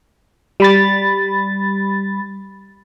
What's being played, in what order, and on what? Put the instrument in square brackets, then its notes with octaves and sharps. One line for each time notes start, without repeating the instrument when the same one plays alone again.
[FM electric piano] G3 B5 A6